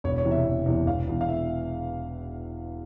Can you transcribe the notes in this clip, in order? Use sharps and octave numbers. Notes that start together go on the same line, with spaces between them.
E1 C#5
C#5
E2 C3 E3
E5
E1
E2 C3 E3
E1 F5
E2 E3
F5
E5